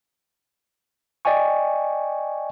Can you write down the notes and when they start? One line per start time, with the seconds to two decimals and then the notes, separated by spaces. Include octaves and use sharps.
1.25 D5 D#5 G5 G#5 C#6